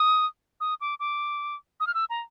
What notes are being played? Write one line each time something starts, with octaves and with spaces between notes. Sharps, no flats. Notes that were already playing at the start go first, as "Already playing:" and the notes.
Already playing: D#6
D#6
D6
D6
D#6
F6
E6
A#5